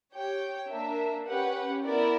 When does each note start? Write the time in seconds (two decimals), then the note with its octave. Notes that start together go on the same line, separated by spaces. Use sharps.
0.14 G4 C#5 G5
0.69 A#3 D4 A#4 E5
1.27 C#4 G4 B4 F#5
1.84 B3 E4 A#4 D5